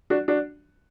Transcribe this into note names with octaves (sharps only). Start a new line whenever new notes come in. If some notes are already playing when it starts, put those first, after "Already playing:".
D4 F#4
D4 F#4